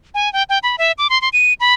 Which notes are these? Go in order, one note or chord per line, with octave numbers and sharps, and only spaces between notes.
G#5
G5
G5
B5
E5
D6
C6
C6
D#7
B5